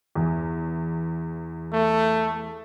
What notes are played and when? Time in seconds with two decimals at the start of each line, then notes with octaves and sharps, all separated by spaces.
0.15 E2
1.73 A3